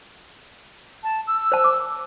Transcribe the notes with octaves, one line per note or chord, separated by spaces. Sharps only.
A5
E6
C5 A5
D6